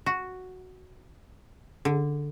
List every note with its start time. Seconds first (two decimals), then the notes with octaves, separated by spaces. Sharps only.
0.06 F#4
1.85 D3